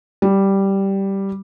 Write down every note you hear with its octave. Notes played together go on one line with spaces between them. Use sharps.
G3